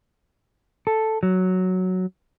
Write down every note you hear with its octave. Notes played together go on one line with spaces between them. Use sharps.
A4
F#3